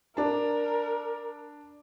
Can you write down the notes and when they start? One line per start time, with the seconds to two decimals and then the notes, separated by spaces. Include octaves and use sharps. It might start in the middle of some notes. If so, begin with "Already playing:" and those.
0.17 D4 A#4 A5